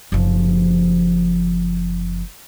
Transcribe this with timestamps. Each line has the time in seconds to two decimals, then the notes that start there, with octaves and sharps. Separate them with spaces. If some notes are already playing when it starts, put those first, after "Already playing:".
0.12 F#1 F3